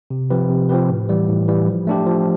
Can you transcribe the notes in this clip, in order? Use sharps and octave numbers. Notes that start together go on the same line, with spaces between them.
C3
F3 C4 G4 B4
C3
F3 C4 G4 B4
A2
E3 G3
A2
E3 G3
F3
A3 D4 G4
F3